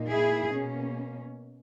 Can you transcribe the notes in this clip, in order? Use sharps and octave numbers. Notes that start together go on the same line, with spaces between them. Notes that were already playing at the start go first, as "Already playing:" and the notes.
Already playing: A#2 A#3 D#4
E4 G#4
B2 A#3 C#4